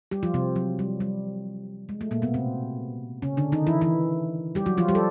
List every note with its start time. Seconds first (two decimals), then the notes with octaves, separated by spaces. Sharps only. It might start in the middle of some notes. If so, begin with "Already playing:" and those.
0.11 G3 G4
0.23 F3 F4
0.34 C3 C4
0.56 F#3
0.79 G3
1.00 G3
1.89 G#3
2.01 A3
2.11 A#2 A#3
2.22 B2 B3
2.34 C3 C4
3.22 C#3 C#4
3.37 D3 D4
3.52 D#3 D#4
3.67 E3 E4
3.81 E3 E4
4.55 G3 G4
4.66 F#3 F#4
4.77 F3 F4
4.88 G3 G4
4.95 A4